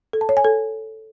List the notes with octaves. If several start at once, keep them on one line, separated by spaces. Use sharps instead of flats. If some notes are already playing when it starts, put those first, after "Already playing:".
A4
A5
C#5
G#5
A4